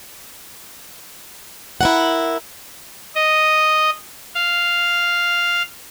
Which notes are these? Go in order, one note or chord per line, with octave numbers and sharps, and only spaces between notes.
E4 A#4 F#5
D#5
F5